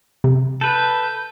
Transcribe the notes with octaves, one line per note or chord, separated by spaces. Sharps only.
C3
A4 B4 G6